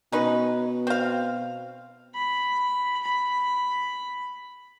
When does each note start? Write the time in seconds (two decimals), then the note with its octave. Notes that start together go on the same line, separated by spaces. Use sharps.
0.12 B2 C#4 D#4 B4
0.87 C4 F5
2.14 B5
3.02 B5